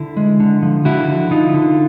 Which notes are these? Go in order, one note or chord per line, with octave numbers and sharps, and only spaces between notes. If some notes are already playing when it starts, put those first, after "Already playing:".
Already playing: D3 D4 E4
G#3
D3
F3
D3 E4 F#4
D3
D3 D#4 F4
D3